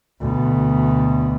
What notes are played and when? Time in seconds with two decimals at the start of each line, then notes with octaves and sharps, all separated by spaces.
0.21 D2 B2